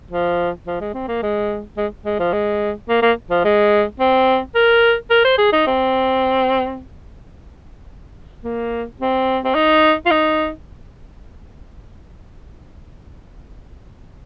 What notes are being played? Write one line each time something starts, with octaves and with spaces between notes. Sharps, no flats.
F3
F3
G#3
C4
A#3
G#3
G#3
G#3
F3
G#3
A#3
A#3
F3
G#3
C4
A#4
A#4
C5
G#4
D#4
C4
A#3
C4
C4
D#4
F4
D#4